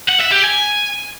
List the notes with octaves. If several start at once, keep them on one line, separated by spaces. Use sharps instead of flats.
F#5
E5
G4
G#5